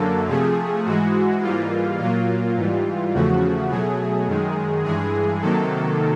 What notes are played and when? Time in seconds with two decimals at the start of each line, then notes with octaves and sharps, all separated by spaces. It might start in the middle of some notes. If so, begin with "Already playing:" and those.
Already playing: F#2 D3 F#3 A#3 A4
0.29 C3 F3 A3 G#4
0.85 G#2 E3 G#3 F#4
1.42 G#2 E3 G3 A#3 F4
1.99 A#2 F#3 A#3 F4
2.56 G#2 E3 G3
3.13 E2 C#3 F3 A3 F#4
3.70 B2 F#3 A3 G#4
4.27 F#2 D#3 G#3
4.84 G2 E3 G#3 G#4
5.41 C3 D#3 F#3 A#3 A4